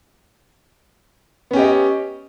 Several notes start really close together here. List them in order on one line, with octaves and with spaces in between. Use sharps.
B3 C#4 G4 D#5